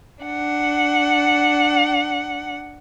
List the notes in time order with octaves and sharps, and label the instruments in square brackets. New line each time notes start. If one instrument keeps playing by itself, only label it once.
[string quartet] D4 F#5